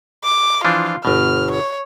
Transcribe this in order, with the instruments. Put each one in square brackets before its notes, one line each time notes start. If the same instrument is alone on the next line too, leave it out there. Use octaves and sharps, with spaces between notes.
[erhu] D6
[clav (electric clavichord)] E3 F3 D4 [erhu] F4
[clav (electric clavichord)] G1 B2 [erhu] F6
[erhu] C#5